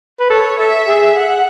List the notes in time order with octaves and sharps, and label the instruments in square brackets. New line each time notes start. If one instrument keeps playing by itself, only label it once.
[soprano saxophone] B4
[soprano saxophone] A4 [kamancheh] C#5
[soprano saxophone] A4 [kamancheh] E5
[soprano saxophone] G#4
[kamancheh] F#5